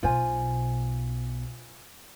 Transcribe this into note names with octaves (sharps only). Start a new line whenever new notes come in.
B1 B2 F4 C5 G#5